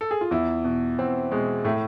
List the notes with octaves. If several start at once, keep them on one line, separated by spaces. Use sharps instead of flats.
A4
G#4
F4
E2 E4
B2
E2 C4
B2 G#3
A2 A3